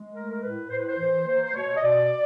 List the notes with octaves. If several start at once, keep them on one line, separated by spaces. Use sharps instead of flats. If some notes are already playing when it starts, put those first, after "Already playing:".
Already playing: G#3
A3 A#4
A#4
A2 B4
A2 C5
B4
C5
E3
A#3 C5
C5
B2 C#5
D#5
B2 D5